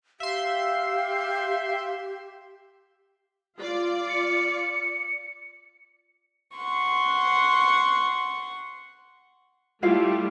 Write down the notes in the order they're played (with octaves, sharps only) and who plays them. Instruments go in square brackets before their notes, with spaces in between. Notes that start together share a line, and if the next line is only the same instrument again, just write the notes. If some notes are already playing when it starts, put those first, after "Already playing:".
[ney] G4 [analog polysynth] E5 C6 [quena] F5
[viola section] F4 D5
[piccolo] C#7
[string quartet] F#5 C6 C#6
[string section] G3 A3 [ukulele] E4 F4 F5